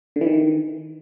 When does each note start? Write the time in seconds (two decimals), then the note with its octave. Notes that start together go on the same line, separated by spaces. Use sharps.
0.16 D3
0.21 E3
0.26 D#3